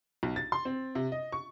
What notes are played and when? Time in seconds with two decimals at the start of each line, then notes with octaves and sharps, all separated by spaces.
0.23 B1
0.36 A6
0.52 C6
0.65 C4
0.95 C3
1.12 D#5
1.32 C#6